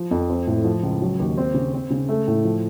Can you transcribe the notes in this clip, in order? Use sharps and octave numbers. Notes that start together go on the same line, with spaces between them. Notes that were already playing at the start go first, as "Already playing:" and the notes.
Already playing: F3
F2
C4
A2
F3
C#2
F#3
D#2
C4
C#3
C4
C#3
A3
A2
F3